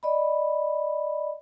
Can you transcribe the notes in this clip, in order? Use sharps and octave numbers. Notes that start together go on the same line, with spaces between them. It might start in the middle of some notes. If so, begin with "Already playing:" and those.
D5 D#5 B5